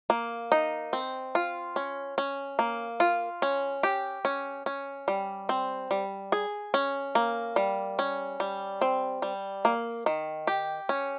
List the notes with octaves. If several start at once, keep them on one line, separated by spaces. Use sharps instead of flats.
A#3
D#4
C4
F4
C#4
C#4
A#3
F4
C#4
G4
C#4
C#4
G3
C4
G3
G#4
C#4
A#3
G3
C#4
G3
C4
G3
A#3
D#3
G4
C#4